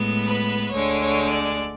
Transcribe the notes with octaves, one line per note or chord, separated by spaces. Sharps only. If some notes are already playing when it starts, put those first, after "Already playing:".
Already playing: A2 G#3 B3
B4
D2 D3 G#3 C#5
C#5
D5